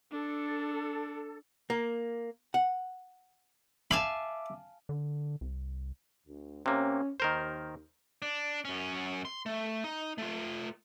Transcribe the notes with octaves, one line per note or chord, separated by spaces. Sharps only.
D4 A4
A#3
F#5
E5 F5 G#5 A5 B5 D6
D3
C2
D2
C3 A#3 C#4
D#2 D#3 A#4 C5
D4
F#2 C#4
C6
A3
D#4
A3 F4